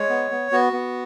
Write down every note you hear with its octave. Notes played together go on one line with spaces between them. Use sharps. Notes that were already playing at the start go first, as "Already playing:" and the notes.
Already playing: G#3 C#5
B3
B3
B3 F#4
B3